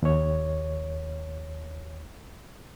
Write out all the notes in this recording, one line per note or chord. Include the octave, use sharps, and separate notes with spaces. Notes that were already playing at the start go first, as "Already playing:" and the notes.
D#2 C#5